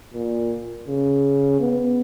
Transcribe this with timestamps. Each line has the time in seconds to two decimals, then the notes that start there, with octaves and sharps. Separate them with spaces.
0.14 A#2
0.88 C#3
1.60 B3